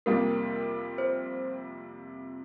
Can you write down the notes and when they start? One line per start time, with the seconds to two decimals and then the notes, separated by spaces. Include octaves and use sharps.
0.06 F2 C3 G3 A#3 F4 A#4
0.98 C5